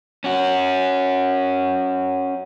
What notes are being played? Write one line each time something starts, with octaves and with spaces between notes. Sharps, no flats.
C#4 F#4